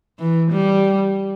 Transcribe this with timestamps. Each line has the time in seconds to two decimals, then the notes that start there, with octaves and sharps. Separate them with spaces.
0.19 E3
0.51 G3